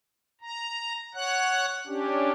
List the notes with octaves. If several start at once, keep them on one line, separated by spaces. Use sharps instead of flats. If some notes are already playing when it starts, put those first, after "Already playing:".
A#5
C#5 F#5 F#6
C#4 D4 G4